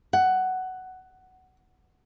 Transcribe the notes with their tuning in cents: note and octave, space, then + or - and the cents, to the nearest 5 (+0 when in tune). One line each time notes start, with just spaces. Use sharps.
F#5 +10